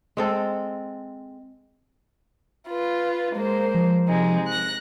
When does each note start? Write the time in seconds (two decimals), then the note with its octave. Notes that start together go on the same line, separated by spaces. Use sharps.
0.17 G#3 C4 A4
2.68 F4 B4
3.34 G#3 A#3 C5
3.74 F3
4.08 C3 G#3 D#4
4.47 F#6 A#6